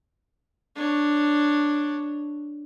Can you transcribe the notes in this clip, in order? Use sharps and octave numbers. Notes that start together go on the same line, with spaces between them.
D4 C#5